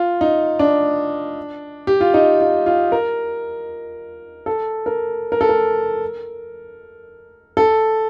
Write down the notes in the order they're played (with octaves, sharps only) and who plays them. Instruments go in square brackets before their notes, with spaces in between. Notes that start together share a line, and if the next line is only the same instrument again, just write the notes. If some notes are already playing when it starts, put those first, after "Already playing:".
Already playing: [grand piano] F4
D#4
D4
G4
F4
D#4
F4
F4
A#4
A4
A#4
A#4
A4
A#4
A4